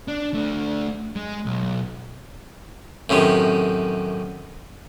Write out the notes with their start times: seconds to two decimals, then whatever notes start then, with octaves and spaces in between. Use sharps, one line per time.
0.08 D4
0.34 A3 D4
1.16 G#3
1.46 B1
3.10 F#2 A2 C3 D#3